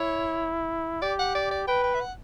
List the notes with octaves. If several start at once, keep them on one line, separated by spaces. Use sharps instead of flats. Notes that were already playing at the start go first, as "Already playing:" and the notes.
Already playing: E4 C#5
G4 D5
F#5
D5
D5
B4 G5
G5
E5
F#5